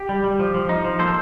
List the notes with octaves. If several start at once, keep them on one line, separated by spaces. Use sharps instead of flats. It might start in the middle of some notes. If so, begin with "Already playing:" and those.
Already playing: G4
G3
G3
F3
F3
D#4
F3
A#3 A4 C5